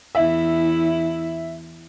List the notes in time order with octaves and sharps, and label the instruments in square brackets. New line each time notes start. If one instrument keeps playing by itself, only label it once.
[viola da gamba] E2 E4 [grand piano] E5